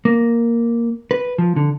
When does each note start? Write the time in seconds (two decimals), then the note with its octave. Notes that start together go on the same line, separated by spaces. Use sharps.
0.05 A#3
1.11 B4
1.38 F3
1.56 D3